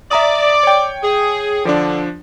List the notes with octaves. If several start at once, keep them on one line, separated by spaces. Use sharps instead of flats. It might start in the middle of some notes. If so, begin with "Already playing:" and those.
D5 E5 A#5 D#6
C#5 G5
G#4
D3 F3 D4